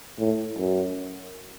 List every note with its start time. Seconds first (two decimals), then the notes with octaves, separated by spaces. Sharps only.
0.19 A2
0.58 F#2